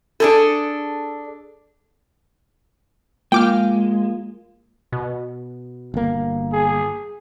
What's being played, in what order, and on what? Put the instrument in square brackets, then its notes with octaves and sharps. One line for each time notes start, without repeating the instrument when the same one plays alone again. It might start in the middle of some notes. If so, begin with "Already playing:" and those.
[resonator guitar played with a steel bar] D4 G#4 A4
[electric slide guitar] G#3 [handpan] A#3 F4 [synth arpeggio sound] G5 D6 F6
[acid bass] B2
[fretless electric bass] G1 A#3
[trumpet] G#4